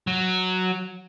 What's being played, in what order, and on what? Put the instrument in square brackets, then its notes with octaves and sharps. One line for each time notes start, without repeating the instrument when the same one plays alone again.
[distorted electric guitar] F#3